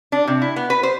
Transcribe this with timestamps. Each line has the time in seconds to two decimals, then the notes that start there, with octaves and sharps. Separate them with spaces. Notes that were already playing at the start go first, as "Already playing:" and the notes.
0.12 D4
0.27 C3
0.42 E4
0.56 B3
0.70 B4
0.83 C5